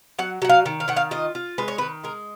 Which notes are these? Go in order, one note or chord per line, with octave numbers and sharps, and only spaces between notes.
F#3 F#5
F#3 F#5
F5
D#3
F5
D#3 F#5
F5
F4 D#5
F4
G#3 B4
C#5
B4
D#3
G#3 A#4